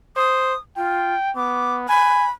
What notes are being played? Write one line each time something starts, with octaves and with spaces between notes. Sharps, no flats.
C5 D#6
F4 G5
B3 D6
G#5 B5